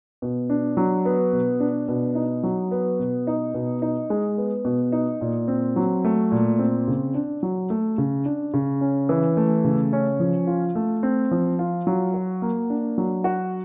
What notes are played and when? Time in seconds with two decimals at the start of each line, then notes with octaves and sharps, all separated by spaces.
0.22 B2
0.50 D4
0.77 F#3
1.05 B3
1.33 B2
1.60 D4
1.88 B2
2.15 D#4
2.43 F#3
2.71 B3
2.99 B2
3.27 D#4
3.54 B2
3.82 D#4
4.10 G#3
4.38 B3
4.65 B2
4.92 D#4
5.21 A#2
5.48 C4
5.76 F#3
6.05 A3
6.32 A#2
6.59 C4
6.88 C#3
7.14 D4
7.43 F#3
7.70 A3
7.98 C#3
8.26 D4
8.54 C#3
8.81 C#4
9.09 E3
9.37 A3
9.64 C#3
9.93 C#4
10.20 F3
10.47 F4
10.75 A3
11.03 C4
11.31 F3
11.59 F4
11.87 F#3
12.14 F#4
12.42 A#3
12.70 D4
12.98 F#3
13.24 F#4